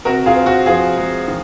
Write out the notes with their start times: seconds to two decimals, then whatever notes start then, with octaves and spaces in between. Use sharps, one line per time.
0.05 C3 F#4 A#4
0.26 F4 G#4
0.35 C4
0.46 F#4
0.66 F3 F4 G#4
0.97 G#3
1.27 D#3